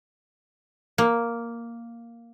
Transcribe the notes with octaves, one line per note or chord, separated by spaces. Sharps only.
A#3